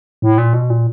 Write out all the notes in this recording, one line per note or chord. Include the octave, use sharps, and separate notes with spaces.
A2
A#2
B2
A#2